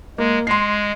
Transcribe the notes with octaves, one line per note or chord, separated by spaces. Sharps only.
G#3 A#3
G#3 C6 C7